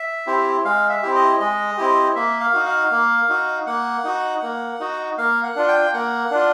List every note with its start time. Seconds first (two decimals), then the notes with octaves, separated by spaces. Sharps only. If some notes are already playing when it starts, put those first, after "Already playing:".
Already playing: E5
0.27 C4 E4 G4
0.65 G#3 F5
0.89 E5
1.03 C4 E4 G4
1.15 D#5
1.40 G#3 D#5
1.78 C4 E4 G4
2.15 A#3 E5
2.40 F5
2.54 D#4 F#4
2.66 F5
2.91 A#3
3.29 D#4 F#4
3.67 A#3 F#5
4.05 D#4 F#4
4.42 A#3
4.80 D#4 F#4
5.18 A#3 F5
5.43 F#5
5.56 D4 F4
5.68 G5
5.94 A#3 F#5
6.31 D4 F4